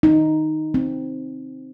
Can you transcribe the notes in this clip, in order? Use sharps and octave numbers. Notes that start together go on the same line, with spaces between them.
D#4
C4